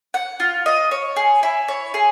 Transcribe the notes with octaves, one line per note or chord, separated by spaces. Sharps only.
F#5
F4
D#5
C#5
G#4
E4
C#5
G#4